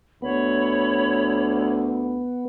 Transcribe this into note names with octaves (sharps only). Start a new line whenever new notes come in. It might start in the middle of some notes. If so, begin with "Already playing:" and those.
D2 B3 C#5 B5